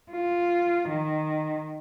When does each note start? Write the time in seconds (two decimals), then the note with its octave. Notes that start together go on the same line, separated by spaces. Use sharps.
0.12 F4
0.89 D#3